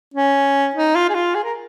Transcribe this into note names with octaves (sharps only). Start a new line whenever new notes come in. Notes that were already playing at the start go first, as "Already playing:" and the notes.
C#4
D#4
F4
G#4
F4
G#4
A#4